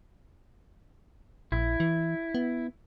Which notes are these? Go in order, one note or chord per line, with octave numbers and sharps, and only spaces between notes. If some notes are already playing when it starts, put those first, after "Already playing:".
A#1 E4
E3
B3